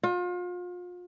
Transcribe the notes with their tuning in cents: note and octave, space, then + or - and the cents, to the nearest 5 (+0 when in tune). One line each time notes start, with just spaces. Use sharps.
F4 +35